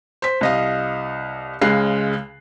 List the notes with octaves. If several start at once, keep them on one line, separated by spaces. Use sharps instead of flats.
C5 B6
C2 D#5 F5
C#2 C#3 G#3 F#6 C7